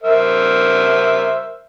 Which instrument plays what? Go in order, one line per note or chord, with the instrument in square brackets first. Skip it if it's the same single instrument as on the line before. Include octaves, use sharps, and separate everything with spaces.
[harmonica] A#4 C5 E5